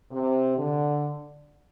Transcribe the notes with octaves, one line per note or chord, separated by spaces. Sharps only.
C3
D3